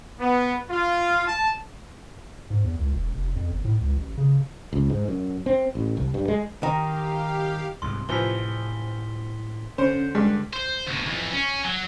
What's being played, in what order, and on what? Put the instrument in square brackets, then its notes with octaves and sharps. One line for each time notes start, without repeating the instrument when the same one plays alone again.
[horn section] B3
F4
A5
[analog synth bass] G#2
E2
C#2
E1
F1
F2
G1
A2
C#2
A1
C#3
[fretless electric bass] C#2
G#2
F#2
C4
A1
C2
G2
G#3
[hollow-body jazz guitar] D#3 [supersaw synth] G4 F5 [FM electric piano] D#5 A#5 [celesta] G5
[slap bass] C2 G#2 [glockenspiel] C6
[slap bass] A2 C3 [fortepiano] E3 F3 [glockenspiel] B6 G7
[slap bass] D3 [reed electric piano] C#4 [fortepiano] C5
[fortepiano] G2 [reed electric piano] G#3
[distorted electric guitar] C5
D2 B2
F2 E3
C#4
F#3